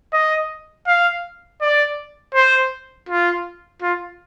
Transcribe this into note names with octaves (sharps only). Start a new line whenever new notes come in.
D#5
F5
D5
C5
F4
F4